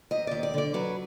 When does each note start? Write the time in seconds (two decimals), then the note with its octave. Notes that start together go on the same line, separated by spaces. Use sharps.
0.11 D#2 D#5
0.27 D#2 D5
0.43 D5
0.54 D3 D5
0.74 F#3 B4